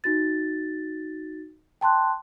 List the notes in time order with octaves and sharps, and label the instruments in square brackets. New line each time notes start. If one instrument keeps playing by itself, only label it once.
[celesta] D#4 F#4 A6
G5 A5 C6 F#6